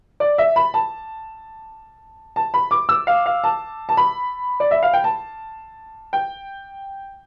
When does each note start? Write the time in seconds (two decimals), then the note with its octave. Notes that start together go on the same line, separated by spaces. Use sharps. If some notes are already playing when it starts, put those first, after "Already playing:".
0.20 D5
0.38 E5
0.56 B5
0.74 A5
2.36 A5
2.54 B5
2.71 D6
2.89 E6
3.07 F5
3.26 F5
3.44 A5
3.89 A5
3.97 B5
4.60 D5
4.71 E5
4.83 F5
4.93 G5
5.04 A5
6.13 G5